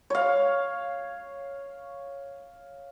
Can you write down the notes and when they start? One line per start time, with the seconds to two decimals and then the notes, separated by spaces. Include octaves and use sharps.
0.10 C#5 F5